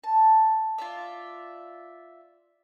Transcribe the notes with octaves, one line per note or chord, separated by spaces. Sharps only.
A5
F4 D5 E5